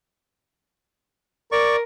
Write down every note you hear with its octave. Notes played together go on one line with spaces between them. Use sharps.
A#4 D5 C#6